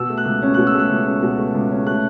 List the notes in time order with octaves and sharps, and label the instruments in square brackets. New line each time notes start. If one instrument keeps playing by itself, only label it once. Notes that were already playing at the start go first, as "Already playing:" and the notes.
Already playing: [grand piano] B2 E6
A3
F#6
C#2
C#4
B2 F#6
E6
A3 F#6
C#2
C#4
B2
A3
C#2
C#4
A3 F#6